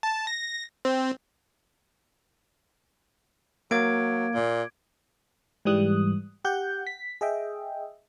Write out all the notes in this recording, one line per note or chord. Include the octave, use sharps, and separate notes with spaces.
A5
A#6
C4
F#3 A#3 A#4 F5 D6 G#6 D7
A#2
G#2 E3 G3 D#6 F#6
G4 F#5 G6
B6
G#4 D#5 E5 G5